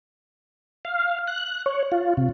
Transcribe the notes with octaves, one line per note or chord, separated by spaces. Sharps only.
F5
F#6
C#5
F4
C3